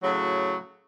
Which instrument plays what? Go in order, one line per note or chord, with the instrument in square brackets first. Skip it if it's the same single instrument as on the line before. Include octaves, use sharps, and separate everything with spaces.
[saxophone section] A2 C#3 F#3